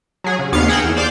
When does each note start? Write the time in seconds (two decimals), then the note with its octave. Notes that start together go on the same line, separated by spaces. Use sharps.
0.24 F#3 G#4
0.39 C#3
0.52 D#2 B3 F5 A6 C7 C#7
0.68 G#4 A#4 F#5 G5 E6
0.84 E2
0.97 C5 D5 F5 C6 D6 G6